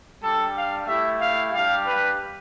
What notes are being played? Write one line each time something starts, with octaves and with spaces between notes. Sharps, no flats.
G3 D4 G4 A4
F5
A3 E4 G4 E5
F5
G3 D4 G4 F5
B4